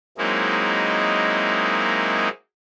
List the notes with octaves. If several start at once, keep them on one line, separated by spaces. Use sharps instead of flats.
F#3 G#3 A#3 C4 D#4 E4